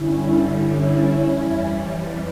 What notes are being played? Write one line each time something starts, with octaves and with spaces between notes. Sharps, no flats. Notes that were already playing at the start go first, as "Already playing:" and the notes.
Already playing: G2 D3 G3 C#4 E4
C#4 E4
F2 E3 G3